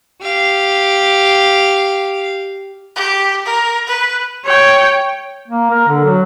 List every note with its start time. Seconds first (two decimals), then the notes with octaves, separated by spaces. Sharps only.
0.22 G4 F5
2.96 G4
3.46 A#4
3.88 B4
4.44 C#5 G5
5.48 A#3
5.71 A#4
5.88 D3
6.05 F#3